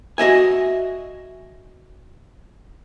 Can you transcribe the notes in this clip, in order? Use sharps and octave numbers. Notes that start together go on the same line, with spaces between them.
F#4 D#5 E5 G#5